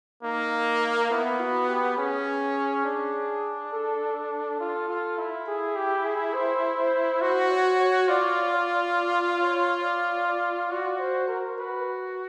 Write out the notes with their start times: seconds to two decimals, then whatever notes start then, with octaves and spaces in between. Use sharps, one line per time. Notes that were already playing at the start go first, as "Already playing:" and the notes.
0.23 A#3 D#4
1.10 B3 E4
1.40 F#4
1.68 G4
1.98 C#4 G#4
2.85 D4
3.72 A4
4.16 A4
4.60 F4
4.89 F4
5.18 E4
5.47 G#4
5.76 G4
6.05 G#4
6.34 C5
6.78 C5
7.21 F#4 C5
7.50 C#5
7.79 C#5
8.08 F4 D5
8.53 D5
8.95 D5
9.40 C#5
9.83 D5
10.27 D5
10.70 F#4 D5
10.99 C5
11.28 A#4
11.57 F#4 B4